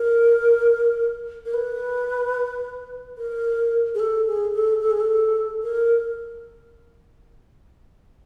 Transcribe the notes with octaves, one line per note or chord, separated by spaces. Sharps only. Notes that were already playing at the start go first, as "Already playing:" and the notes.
Already playing: A#4
A#4
B4
A#4
G#4
A4
G#4
A4
A4
G#4
A4
A#4